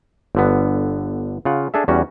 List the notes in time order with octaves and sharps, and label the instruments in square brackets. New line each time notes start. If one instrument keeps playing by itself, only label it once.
[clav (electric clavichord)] G1 D3 B3
C#3 F4 F#5
D4 G#4 A4 E5
E2 G3 C#4 F#4